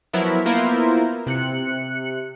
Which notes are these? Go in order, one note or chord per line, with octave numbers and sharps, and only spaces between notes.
F3 F#3 B3 E4 A#4
A#3 B3 E4 F4 A#4 C5
C3 F#6 C#7